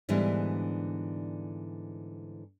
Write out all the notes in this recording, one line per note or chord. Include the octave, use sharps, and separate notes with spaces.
G#2 D3 E3 G3 B3 D4